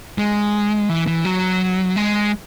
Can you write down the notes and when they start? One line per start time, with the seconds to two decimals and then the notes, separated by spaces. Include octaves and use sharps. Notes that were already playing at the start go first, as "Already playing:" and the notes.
0.18 G#3
0.89 E3
1.07 E3
1.25 F#3
1.96 G#3